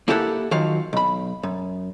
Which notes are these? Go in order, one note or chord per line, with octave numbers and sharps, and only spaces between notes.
A#3 E4 G4 A4 D5 F#5
D#3 F3 F#3 F5
B1 B5
F#2